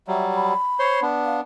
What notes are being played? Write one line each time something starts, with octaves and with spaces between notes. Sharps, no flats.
F#3 G3 E5
B5
C5 C#5 C6
B3 D4
F5